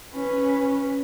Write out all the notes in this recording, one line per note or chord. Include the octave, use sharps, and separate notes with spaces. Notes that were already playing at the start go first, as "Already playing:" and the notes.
C#4 B4